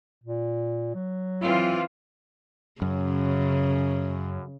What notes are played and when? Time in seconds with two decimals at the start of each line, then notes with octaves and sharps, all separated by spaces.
0.24 A#2
0.95 F#3
1.41 E3 C4 F4
2.82 F#2 C#3